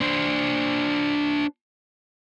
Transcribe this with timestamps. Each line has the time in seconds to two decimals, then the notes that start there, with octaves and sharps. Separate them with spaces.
0.01 D4 C5